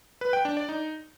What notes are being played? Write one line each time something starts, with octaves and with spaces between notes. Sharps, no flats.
B4
G5
D4
D5
D#4